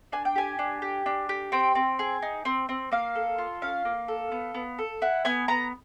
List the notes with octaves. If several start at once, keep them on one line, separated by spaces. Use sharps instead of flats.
D4 G#5
G5
G4 G#5
D4
G4
D4
G4
C4 G5
C4
G#4
D#4
C4
C4
A#3 F5
A4
F4
C#4 F5
A#3
A4
B3
B3
A4
E4 F#5
B3 G#5
B3 A#5